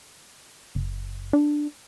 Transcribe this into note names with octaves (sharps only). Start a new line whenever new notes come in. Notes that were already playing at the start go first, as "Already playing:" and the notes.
F#1
D4